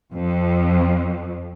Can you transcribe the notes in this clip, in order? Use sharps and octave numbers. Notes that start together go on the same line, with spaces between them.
F2